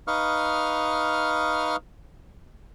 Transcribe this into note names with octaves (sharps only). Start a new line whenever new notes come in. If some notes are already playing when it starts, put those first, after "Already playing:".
D#4 B4 F5 C#6 D#6 F6